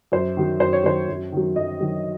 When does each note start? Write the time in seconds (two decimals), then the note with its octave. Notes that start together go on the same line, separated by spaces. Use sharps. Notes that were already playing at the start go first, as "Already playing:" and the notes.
0.12 F#2 C5
0.37 D#3 F#3
0.60 F#2 C5
0.73 C#5
0.84 D#3 F#3 C5
1.08 F#2
1.32 D#3 F#3
1.56 F#2 D#5
1.81 D#3 F#3